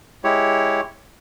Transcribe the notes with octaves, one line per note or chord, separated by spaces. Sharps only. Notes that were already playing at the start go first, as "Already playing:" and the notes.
G#3 E4 G4 C#5